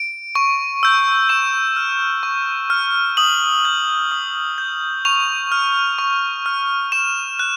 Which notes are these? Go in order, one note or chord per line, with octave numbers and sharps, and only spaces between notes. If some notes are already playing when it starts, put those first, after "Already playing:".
Already playing: D7
C#6
E6 G6
C#6 E7
F6
C#6
F6
D#6 F#7
G6
D#6
G6
C#6 F7
F6
C#6
F6
C#6 E7
F#6